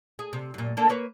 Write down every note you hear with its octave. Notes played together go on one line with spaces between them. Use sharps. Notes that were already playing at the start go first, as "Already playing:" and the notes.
G#4
C3
F#2 A#2
A#3 D4 A4
A#3 B4 C#5